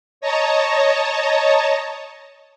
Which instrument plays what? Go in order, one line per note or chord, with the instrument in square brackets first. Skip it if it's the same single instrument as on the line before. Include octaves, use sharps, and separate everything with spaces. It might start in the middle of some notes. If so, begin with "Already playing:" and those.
[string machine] C#5 D#5 A5 A#5